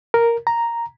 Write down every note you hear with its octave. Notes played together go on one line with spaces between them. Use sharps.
A#4
A#5